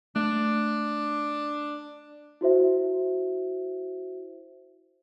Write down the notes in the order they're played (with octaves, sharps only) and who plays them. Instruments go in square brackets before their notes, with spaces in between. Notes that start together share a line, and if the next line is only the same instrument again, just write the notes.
[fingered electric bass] A3 [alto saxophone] D4
[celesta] E4 F#4 C5 E5